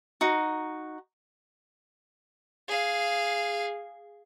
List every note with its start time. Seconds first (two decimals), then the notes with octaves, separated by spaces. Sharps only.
0.21 D#4 F#4
2.68 G#4 F5